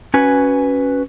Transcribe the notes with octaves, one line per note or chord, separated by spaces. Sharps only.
C#4 F#4 B4 G#5